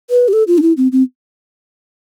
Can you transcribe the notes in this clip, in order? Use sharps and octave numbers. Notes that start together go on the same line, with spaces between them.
B4
G4
A4
F4
D4
E4
C4
C4